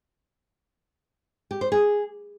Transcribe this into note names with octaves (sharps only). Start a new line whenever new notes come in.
G4
C5
G#4